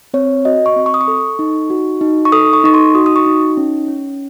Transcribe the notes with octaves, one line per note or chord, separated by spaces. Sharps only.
C4 C#5
F#4 D#5
C#6
C4
C#6
D#6
C#6
A4
D#4
F#4
D#4
C#6
A4 D#6
C#6
D#4 C#6
C6
F#4 D#6
D#6
C#6
D#4
C#4
C#4